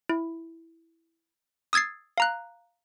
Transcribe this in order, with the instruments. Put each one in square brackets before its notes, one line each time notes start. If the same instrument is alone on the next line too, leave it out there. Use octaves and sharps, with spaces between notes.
[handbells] E4
D#6 E6 G#6 A6 C7
F5 A#5 F#6